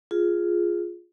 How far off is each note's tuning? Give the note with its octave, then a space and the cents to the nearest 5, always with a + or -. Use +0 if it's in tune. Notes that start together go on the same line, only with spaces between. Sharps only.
F4 +0 G#4 +0